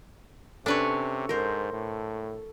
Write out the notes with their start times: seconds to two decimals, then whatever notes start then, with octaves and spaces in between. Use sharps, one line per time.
0.66 C3 C#4 D4 A4 B4 C#5 C#6
1.29 G#2 A#4 C5
1.73 A2